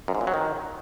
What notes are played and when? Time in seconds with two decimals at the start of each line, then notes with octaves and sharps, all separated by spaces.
0.08 F#2
0.15 G#2
0.21 A#2
0.27 F#3
0.34 D#3